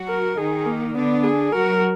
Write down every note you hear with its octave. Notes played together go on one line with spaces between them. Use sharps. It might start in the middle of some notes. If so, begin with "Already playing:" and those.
Already playing: F#3 F#4
A#4
D#3 D#4 G#4
A#3
D3 B3 D4
G#4
F#3 F#4 A#4